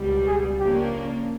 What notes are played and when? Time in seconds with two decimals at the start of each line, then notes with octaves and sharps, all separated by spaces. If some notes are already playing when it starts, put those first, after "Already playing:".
Already playing: C#2 B2 G3
0.27 G#4
0.59 C#3 F3 A#3 D4 G4